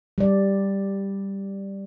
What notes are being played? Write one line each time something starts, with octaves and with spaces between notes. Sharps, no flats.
G3 D5